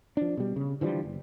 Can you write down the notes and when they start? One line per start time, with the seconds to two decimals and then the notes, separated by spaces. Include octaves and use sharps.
0.17 F3 D4
0.37 B2 G3
0.56 C#3
0.81 D3 E3 F3 G3
1.03 F#1